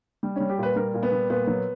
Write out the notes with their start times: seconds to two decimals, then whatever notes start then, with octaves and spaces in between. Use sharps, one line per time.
0.23 G3
0.36 G3 C#4
0.50 G4
0.58 A#2 B4
0.76 G3 A#4
0.94 A#2
1.03 B3
1.12 G3
1.30 A#2 B3
1.47 F#3